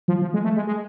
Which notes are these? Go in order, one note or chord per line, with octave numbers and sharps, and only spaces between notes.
F3
F3
G#3
A3
G#3
G#3